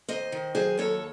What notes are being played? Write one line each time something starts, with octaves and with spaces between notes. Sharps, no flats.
D#2 C5 D#5
D#3
F#3 G#4 C5
D#2 A4 C#5